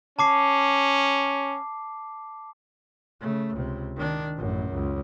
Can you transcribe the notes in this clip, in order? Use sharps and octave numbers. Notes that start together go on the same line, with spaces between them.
C#4 A5 D6 C7
C#3 A3
C#2 C3
D#3 D4
A1 F#2
C#2